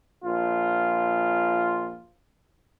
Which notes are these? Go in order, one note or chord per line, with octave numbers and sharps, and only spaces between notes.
A#1 F4